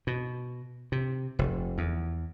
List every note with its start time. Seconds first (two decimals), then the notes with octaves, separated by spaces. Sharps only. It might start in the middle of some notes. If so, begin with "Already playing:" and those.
0.07 B2
0.92 C3
1.39 F1
1.78 E2